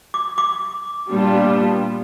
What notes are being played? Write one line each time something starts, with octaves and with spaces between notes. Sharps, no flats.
D6
D6
A#2 G3 B3 D4 F4